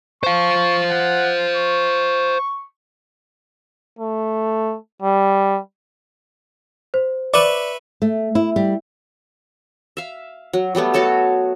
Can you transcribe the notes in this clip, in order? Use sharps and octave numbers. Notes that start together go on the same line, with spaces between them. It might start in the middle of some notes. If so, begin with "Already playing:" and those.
C5 F5 C#6
F#5
C#6
A3
G3
C5
B4 D5 E5 C#6
A3
E4
G3
E5 F5
F#3
F#3 G3 A3 B3
F#4 A4 C#5 A5